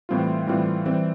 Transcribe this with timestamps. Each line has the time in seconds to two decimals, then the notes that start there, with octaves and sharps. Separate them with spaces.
0.09 A2 E3 G3 C4 F4
0.47 A2 E3 G3 C4 F4
0.86 E3 G3 C4